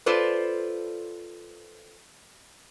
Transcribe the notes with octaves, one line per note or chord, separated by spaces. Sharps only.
F4 A4 B4 C5 D5